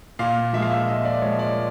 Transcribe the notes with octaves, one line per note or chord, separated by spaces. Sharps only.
A#2 F5
F3 G#3 E5
F5
E5
A#2 D#5
D5
F3 G#3 C#5
D5